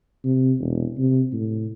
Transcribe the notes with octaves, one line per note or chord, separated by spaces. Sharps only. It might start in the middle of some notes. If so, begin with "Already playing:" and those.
C3
E1
C3
A2